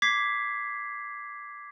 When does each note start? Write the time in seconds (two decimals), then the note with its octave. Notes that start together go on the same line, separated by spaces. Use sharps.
0.02 D6 G#6 B6 C7